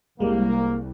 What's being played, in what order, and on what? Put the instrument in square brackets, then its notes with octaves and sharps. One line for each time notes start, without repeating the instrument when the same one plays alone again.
[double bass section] C2 [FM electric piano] G3 G#3 [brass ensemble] A#3